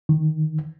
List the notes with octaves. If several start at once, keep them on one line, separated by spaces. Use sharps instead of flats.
D#3